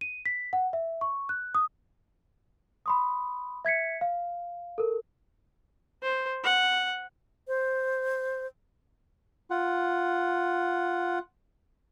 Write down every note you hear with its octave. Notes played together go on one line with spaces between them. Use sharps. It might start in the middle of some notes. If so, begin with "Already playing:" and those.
D#7
B6
F#5
E5
C#6
F#6
D#6
B5 C6 D#6
E5 G#6 B6 C#7
F5
A4 A#4
C5
F#5
C5
F4 F#5